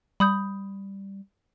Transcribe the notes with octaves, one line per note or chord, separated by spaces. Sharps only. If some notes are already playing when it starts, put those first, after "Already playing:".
G3 B5 D#6 G6